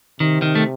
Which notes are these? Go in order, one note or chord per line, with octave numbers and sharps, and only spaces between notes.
C3 D#3
D#3
A3